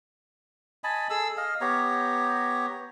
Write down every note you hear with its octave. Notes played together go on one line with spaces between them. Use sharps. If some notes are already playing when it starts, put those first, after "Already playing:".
D#5 G#5 A5 B5
G#4 A4 E6
D#5 F5
B3 G4 C#5 A#5